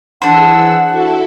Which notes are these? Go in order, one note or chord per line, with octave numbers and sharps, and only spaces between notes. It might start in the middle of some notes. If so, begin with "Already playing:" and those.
E3 D4 G#4 C5 F#5 E6
E4 F#4 A4